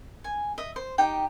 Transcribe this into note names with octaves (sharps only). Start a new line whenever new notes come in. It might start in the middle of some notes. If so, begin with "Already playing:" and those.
G#5
D#5 E5
C5
D#4 G4 G5